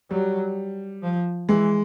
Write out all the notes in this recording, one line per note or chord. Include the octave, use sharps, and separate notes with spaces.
F#3 G3
F3
E3 G#3